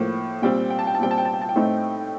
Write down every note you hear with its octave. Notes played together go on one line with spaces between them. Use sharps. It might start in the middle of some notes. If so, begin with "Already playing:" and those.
Already playing: A2 F3 A#3
A#2 G3 C4 G5
G5
A5
G5
A5
A#2 G3 C4 G5
A5
G5
A5
G5
A5
G5
A2 A3 C4 D#4